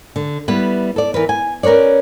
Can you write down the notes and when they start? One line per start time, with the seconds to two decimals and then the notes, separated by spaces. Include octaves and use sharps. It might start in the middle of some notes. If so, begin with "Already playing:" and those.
0.16 D3
0.48 G3 B3 E4 B4
0.96 A4 D5
1.14 E3 A#4 B4
1.29 G#5
1.63 C#4 A#4 B4 C#5 D5